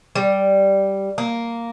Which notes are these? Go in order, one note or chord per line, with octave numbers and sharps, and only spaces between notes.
G3
A#3